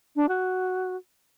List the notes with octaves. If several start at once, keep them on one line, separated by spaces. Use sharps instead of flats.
D4
F#4